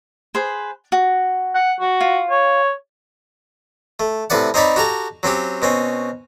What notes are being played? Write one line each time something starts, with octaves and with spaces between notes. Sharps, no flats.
G#4 B4 C5
F#4
F#5
F#4
F4
C#5
A3
A2 C3 B4 D5 F#5
C4 D#4 C#5 D5 B5
F#4 G4 A4 A#5
F#3 C4 C#4 G4
B2 C4 C#4